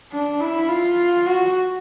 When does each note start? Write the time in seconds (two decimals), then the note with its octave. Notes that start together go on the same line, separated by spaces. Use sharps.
0.12 D4
0.40 E4
0.69 F4
1.26 F#4